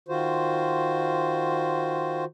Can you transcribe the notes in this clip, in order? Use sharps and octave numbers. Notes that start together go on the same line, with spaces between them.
D#3 F4 F#4 C5